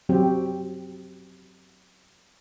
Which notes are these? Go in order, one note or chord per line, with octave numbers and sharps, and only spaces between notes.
F#3 C4 G4